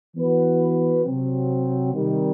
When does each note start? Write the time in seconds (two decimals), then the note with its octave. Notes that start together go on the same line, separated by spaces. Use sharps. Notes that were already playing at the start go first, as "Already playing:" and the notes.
0.16 E3 B3 F#4 B4
1.04 C3 F#3 C4
1.93 C3 D#3 G3